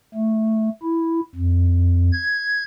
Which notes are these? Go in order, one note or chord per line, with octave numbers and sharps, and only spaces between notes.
A3
E4
F2
G#6